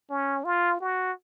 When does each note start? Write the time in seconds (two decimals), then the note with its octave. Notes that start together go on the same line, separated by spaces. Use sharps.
0.10 C#4
0.44 F4
0.80 F#4